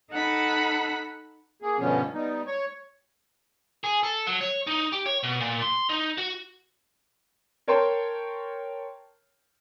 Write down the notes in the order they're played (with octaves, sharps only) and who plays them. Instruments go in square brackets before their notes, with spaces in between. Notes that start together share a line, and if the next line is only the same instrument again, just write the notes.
[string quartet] D#4 A4 F#5 A5 B5
[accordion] A#3 G#4
G2 B2 D3 F3 B3 C#4
G3 B3 D#4
C#5 C#6
[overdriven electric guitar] G#4
A4
F#3
C#5
D#4
G4
C#5
B2
A#2
C6
D#4
F#4
[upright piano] A#4 C#5 G5 A5 C6